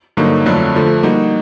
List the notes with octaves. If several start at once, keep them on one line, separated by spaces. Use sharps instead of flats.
G2 D3 F#3 A#3 D#4
F2 D3 F#3 A3 D4
D3 F3 A3
G3 A#3 D#4 F#4